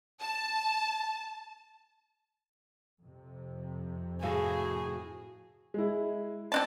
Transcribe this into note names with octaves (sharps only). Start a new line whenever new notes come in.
A5
F2 C3
A2 F#4 G#4 F5
G#3 E4
C4 D4 A5